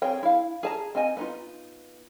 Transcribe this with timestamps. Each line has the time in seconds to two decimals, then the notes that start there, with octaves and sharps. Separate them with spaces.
0.02 C4 G#4 C#5 G5
0.23 E4 F5
0.63 G#4 A5 A#5
0.95 C4 D#4 D#5 G#5
1.17 B3 D#4 F4